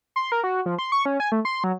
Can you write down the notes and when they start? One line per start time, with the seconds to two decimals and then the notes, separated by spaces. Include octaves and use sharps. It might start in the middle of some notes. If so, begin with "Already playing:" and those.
0.16 C6
0.32 A#4
0.44 F#4
0.66 F3
0.79 C6
0.92 C#6
1.05 C#4
1.20 G#5
1.32 A3
1.45 C6
1.64 F#3